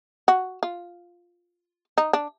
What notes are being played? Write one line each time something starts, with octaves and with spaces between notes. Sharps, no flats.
F#4
F4
D#4
D4